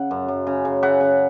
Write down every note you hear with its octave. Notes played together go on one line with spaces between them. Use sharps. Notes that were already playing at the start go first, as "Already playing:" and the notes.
Already playing: C#3 F#5
F#2
F#2
C#3
C#3
C#3 E5 F#5
C#3